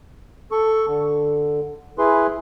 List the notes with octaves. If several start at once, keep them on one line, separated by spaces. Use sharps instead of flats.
A4 C#6
D3
E4 G#4 B4 C6